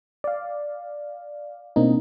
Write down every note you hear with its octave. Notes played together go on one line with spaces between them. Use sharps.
D5 F5
B2 A#3 C4 D4 D#4